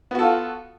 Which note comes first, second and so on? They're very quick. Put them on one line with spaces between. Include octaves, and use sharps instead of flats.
B3 F#4 A4 F4